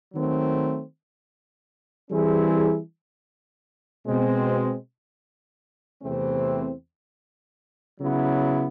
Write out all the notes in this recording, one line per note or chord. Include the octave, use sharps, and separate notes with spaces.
D#3 F#3 A3 C4
E3 G3 C4 E4 G#4
B2 G#3 C4
E2 C3 E3 A3 C4
C#3 F#3 B3 E4